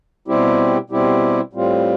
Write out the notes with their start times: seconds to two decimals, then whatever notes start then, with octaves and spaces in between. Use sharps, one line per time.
0.28 B2 G3 C4 E4 G4
0.90 B2 G3 C4 E4 G4
1.53 A2 G3 C4 F4